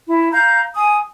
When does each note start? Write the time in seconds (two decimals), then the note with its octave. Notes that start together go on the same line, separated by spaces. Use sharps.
0.08 E4
0.32 F5 A#5 G6
0.75 G#5 D#6